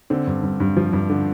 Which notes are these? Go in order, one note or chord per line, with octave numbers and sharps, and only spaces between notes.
D3 C4
G2
G2
G2
F3
G2
D3